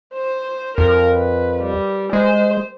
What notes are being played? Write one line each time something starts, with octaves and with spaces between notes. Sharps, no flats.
C5
F2 A#4
B4
G3
G#3 C5